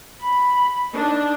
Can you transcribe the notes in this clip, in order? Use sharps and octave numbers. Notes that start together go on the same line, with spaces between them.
B5
D4 D#4